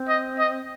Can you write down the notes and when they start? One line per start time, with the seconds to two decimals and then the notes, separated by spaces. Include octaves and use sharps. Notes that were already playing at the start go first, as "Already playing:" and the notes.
Already playing: C4
0.09 D#5
0.39 D#5